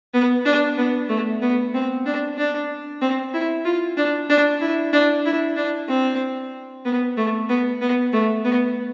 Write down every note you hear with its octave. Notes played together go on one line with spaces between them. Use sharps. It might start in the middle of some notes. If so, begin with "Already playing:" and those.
B3
D4
B3
A3
B3
C4
D4
D4
C4
E4
F4
D4
D4
E4
D4
E4
D4
C4
B3
A3
B3
B3
A3
B3